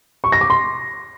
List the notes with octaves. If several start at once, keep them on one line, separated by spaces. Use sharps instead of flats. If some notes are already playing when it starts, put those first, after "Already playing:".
C#6
A#6
D6
C6